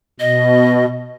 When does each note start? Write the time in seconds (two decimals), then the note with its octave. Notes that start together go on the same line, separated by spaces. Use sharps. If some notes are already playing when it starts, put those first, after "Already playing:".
0.20 B2 D#5